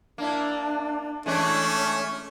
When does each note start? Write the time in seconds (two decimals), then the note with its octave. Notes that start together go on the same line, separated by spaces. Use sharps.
0.18 A#3 D4 E4
1.26 E3 G#3 A3 C#4 D4